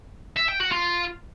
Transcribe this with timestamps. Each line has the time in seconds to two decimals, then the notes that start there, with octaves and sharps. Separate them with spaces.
0.37 E5
0.49 G5
0.60 F#4
0.72 F4